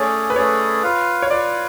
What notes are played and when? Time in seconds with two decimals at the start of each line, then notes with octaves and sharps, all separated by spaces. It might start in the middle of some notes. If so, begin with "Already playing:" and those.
Already playing: A3 C#4 G#4 C#5 D5
0.30 B4
0.36 A3 C#4 G#4 C#5 D5
0.83 F4 B4 F5
1.22 C#5
1.30 F4 B4 D5 F5